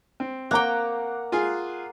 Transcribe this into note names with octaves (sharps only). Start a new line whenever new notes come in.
C4
A#3 F#5 G5 A#5 D6
F4 G#4 G#5